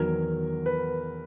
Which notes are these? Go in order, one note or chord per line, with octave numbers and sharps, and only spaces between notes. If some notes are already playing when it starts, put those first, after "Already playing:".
Already playing: E2 D#3 F#3 A#4
B4